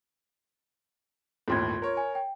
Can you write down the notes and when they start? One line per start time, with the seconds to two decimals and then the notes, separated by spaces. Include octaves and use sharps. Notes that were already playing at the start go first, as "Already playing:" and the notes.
1.48 G1 D#2 A2 F4 C6 G#6
1.82 A#4 C#5
1.97 G#5
2.15 G5